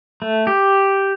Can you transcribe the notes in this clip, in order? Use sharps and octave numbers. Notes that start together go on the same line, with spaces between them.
A3
G4